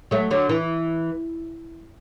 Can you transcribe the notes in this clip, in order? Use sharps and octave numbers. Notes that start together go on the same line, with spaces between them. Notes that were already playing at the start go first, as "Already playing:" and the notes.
F#3 A3
D3 F#3
E3